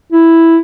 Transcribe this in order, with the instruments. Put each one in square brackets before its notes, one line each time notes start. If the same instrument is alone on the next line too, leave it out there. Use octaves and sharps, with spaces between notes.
[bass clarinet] E4